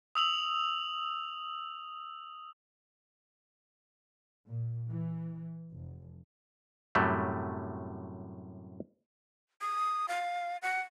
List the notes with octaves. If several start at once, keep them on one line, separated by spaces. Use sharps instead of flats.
D#6 E6 F7 F#7
A#2
E3
F1
F#2 A2 C3 F#3 G3 A3
D#6
F5
F#5